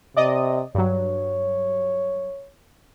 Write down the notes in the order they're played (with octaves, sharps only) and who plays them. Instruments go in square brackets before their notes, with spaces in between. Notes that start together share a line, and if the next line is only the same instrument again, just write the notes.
[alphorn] C3 [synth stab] D5 D#5 D#6
[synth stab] G2 F#3 [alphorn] C#5